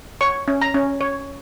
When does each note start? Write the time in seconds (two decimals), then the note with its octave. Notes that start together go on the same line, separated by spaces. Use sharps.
0.21 C#5 C#6
0.48 C#4
0.62 A#5
0.74 C#4
1.01 C#5